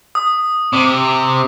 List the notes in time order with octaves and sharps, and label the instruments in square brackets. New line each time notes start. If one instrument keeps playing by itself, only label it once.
[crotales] D#6
[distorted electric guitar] C3 [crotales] D6